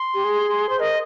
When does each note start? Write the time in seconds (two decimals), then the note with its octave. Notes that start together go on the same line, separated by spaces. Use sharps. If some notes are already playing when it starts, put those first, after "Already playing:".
Already playing: C6
0.14 G4
0.24 G#4
0.69 C5
0.79 A#4 D#5